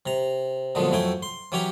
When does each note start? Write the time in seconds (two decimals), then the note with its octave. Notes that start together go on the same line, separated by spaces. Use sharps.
0.06 C3 A#5
0.75 A#2 D3 F3 F#3 G#3 B3
0.91 F2 F#3 A3 E4 G5 G#5
1.23 C6
1.52 E3 F#3 C#4 G4 C#5 A#5